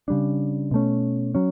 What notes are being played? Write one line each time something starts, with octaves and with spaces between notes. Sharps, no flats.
C#3 G3 D4
B2 A3 C#4
F#3 C#4